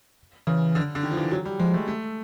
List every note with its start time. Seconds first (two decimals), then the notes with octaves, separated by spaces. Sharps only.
0.47 C#3 E3
0.75 D3
0.95 D3
1.03 D#3
1.11 F3
1.17 E3
1.31 F#3
1.45 G3
1.59 F3 G#3
1.73 A3
1.88 A3